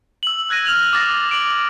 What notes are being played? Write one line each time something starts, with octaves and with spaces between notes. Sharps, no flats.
E6 F#7
E6 F#6 G#6 A#6 D#7
F6 F7 F#7
D6 D#6 A6 A#6
D6 D7 F#7